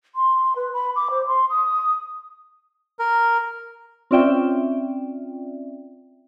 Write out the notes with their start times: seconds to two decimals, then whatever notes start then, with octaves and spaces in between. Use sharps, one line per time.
0.15 C6
0.56 B4
0.74 B5
0.96 D6
1.10 C5
1.27 C6
1.50 D#6
2.99 A#4
4.11 C4 C#4 F4 D5 E5 G5